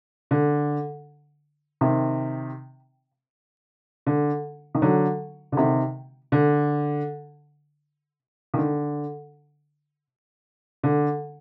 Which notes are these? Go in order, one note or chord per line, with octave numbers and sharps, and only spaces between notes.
D3
C3 D#3
D3
D#3
D3 F#3
D3
C3 D#3
D3
D#3
D3
D3